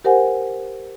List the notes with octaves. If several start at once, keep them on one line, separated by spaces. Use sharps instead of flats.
G4 A#4 C5 F#5 G#5